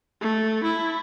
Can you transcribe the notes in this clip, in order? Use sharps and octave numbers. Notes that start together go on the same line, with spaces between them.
A3
E4